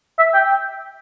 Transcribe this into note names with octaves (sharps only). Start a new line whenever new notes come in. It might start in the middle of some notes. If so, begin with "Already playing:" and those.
E5
G5